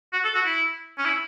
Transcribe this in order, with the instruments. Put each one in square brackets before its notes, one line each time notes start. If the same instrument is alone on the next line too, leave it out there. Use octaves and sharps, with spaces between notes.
[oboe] F#4
A4
F#4
E4
C#4
E4